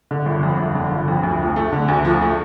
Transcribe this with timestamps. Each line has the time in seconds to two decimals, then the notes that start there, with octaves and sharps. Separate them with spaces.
0.11 D3
0.26 G1
0.43 F2
0.59 G1
0.75 D3
0.92 G1
1.08 F2
1.23 D2
1.40 F3
1.56 A3
1.73 D3
1.88 D2
2.05 F3
2.21 A3